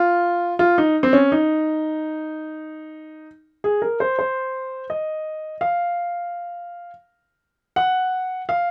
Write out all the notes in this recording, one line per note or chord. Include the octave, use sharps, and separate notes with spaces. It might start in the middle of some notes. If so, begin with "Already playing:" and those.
Already playing: F4
F4
D#4
C4
C#4
D#4
G#4
A#4
C5
C5
D#5
F5
F#5
F5